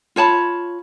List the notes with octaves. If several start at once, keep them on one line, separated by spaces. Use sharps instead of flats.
F4 C#5 A5 B5